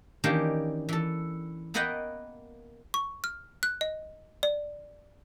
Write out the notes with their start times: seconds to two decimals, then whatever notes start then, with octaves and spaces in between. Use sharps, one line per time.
0.24 D#3 E3 A#3 C#4 D4 G4
0.89 E3 A4
1.74 A#3 B3 B4 D#5 F#5 G5
2.94 C#6
3.24 F6
3.63 F#6
3.81 D#5
4.43 D5